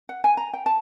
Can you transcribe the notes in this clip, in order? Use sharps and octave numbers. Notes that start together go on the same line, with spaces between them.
F#5
G#5
A#5
G5
A5